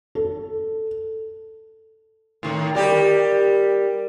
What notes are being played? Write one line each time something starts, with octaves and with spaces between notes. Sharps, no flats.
A4
A2 D#3
G3 G4 A#4